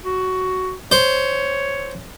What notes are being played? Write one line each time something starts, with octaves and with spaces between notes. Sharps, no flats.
F#4
C5 C#5